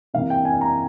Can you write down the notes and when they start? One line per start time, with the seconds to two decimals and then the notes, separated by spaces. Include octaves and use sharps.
0.14 C3 E3 A#3 F5
0.30 G5
0.45 G#5
0.61 A#5